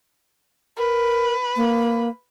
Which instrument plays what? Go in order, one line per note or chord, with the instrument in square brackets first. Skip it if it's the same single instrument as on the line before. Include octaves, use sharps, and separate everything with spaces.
[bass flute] A#4 [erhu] B4
[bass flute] A#3